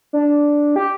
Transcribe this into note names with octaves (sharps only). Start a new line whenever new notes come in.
D4
G4